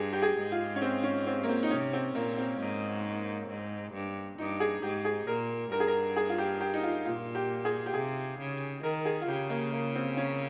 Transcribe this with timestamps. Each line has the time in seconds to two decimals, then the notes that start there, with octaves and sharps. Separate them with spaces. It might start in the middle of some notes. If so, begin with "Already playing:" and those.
Already playing: G2 G#4
0.13 G4
0.22 G#4
0.38 G#2
0.52 F4
0.76 C#4
0.82 C4
1.03 C#4
1.27 C4
1.43 A#3
1.49 C4
1.63 D#4
1.70 C3 C#4
1.93 C4
2.15 A#2 A#3
2.38 C4
2.59 G#2
3.49 G#2
3.93 G2
4.38 G2 D#4
4.60 G#4
4.82 G#2 G4
5.05 G#4
5.27 A#2 A#4
5.71 G2 A#4
5.80 G#4
5.88 A#4
6.16 G#4
6.29 F4
6.38 G4
6.61 G4
6.74 D#4
6.83 F4
7.05 A#2 F4
7.35 G4
7.65 G#4
7.86 G4
7.94 C3 G#4
8.39 C#3
8.83 D#3 A#4
9.05 G#4
9.22 F4
9.28 C#3 G4
9.50 A#3
9.72 A#3
9.95 C4
10.17 C#4